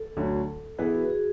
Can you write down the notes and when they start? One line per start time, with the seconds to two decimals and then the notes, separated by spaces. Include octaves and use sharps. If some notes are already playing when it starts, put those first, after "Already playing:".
Already playing: A4
0.17 D2 D3 F#3
0.78 E3 B3 E4 G#4 B4
0.95 F#4
1.10 G#4